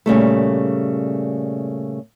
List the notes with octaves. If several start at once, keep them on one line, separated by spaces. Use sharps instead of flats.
A#2 C#3 G3 A3